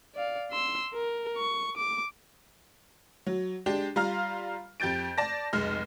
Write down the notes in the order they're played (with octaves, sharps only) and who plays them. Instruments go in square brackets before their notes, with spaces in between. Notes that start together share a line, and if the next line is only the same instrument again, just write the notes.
[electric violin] D5 F5
C6 E6
A#4
C#6
D6
[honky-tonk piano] F#3
G#3 D4 G4
G3 F4 F5 A#5 F6
F2 G4 G6 A6 D7
D5 A5 A#6
F1 B1 G#3 F6